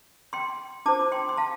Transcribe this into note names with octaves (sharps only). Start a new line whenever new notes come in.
G5 C6
D4 F4 C5 A5 D6
G5 C6
C6
F5 A5